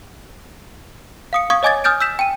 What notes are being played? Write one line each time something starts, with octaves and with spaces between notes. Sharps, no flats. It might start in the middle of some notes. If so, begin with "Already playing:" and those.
F5 D#6 C#7
F5 C#6 D#6 G#6
C#5 D#5 G#5 D6 G#6 A6
G#5 D#6 F6 G6 A6 D7
E6 G6 B6 E7
G5 G#5 D#7